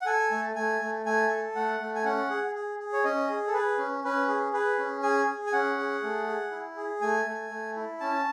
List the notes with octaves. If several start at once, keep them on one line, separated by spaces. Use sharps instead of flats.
F#5
A4 G#5
A3
A3 G#5
A3
A3 G#5
A4
A3 F#5
A3
G#5
C#4 F#5
G#4
G#4
G#4
C#5
C#4 D#5
G#4
A4
G#4 B4
C#4
C#4 B4
G#4
G#4 B4
C#4
G#4 G#5
G#4
G#5
C#4 F#5
G#4
A3
G#4
E4
G#4
A3 G#5
A3
A3
E4
C#4 A5